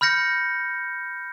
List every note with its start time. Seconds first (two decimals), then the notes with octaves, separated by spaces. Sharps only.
0.01 B5 F6 G6 A#6 C#7